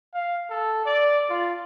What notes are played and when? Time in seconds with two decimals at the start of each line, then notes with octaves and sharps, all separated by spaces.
0.14 F5
0.50 A4
0.85 D5
1.30 F4